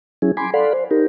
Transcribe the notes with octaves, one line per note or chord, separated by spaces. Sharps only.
F#3 C#4 E4 G#4
G#5 B5 C6 D6
A4 D5 F5 F#5 B5 C6
C5
D#4 G4 A#4